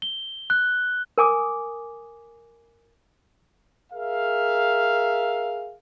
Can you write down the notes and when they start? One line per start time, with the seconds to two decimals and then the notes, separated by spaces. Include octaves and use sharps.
0.02 G7
0.50 F#6
1.18 A#4 G#5 D6 D#6
3.93 G#4 A#4 E5 F5